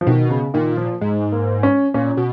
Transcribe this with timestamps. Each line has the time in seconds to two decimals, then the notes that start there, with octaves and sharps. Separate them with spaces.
0.01 F3
0.07 B2 D#3
0.30 C#3
0.54 A#2 D#3
0.77 F3
1.01 G#2 G#3
1.32 A#3
1.63 C#4
1.94 A#2 C#4
2.17 B2